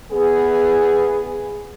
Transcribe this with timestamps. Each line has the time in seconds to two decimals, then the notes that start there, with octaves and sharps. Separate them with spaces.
0.11 E2 B3 G#4